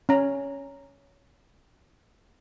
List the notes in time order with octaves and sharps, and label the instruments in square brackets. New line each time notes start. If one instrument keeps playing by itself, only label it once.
[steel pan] C#4 A#5